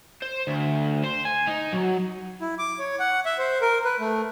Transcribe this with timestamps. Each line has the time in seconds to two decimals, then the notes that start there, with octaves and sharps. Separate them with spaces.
0.22 C5
0.47 D2
1.04 C5
1.25 G#5
1.47 D#4
1.73 F#3
2.41 E4
2.59 D6
2.79 C#5
2.99 F#5
3.25 E5
3.38 C5
3.61 A#4
3.85 B4
4.00 A3